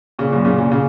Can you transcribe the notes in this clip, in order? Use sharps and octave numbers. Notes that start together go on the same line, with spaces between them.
A#2 C#3
F#2 A#2
A#2 C#3
A#2 C#3
A#2 C#3